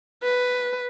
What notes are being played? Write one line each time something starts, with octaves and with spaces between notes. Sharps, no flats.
B4